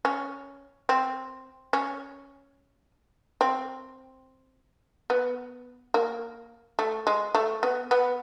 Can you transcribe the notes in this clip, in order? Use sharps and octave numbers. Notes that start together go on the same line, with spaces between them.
C#4
C4
C#4
C4
B3
A#3
A3
G#3
A3
B3
B3